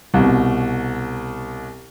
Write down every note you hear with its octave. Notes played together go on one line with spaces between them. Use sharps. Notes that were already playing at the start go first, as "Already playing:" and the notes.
C2 B2